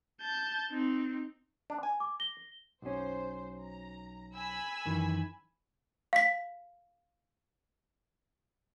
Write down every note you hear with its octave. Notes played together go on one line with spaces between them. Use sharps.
A5 G6
C4 D#4
D4
G#5
D6
A#6 G7
B1 C#4 C5
A#5
G#5 B5 E6
F#2 D#3 E3
F5 B6